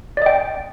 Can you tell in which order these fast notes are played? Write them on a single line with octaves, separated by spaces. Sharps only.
D5 D#5 G5